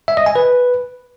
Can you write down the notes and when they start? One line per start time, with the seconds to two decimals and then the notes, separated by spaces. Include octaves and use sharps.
0.08 E5
0.17 D#5
0.26 G#5
0.36 B4